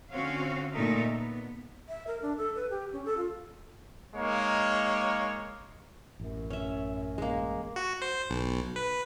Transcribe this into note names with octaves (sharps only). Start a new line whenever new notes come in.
D3 C4 C#4 F#4 C#5 F5
A#2 A3 D#4 A4 A#4 E5
B3
E5
A#4
D4
A4
B4
G4
C#4
A4
F4
G#3 A#3 D#4 C#5
A1 F#2
C#4 E5
G#3 A#3
F#4
C5
B1
B4